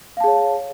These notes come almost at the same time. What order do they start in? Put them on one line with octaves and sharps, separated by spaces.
F5 A5 G#4 C#5